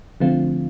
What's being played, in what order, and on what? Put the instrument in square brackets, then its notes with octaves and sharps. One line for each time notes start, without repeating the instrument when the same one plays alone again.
[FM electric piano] D3 F3 A3 C4 F4